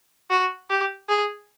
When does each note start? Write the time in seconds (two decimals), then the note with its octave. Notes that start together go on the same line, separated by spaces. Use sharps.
0.30 F#4
0.70 G4
1.09 G#4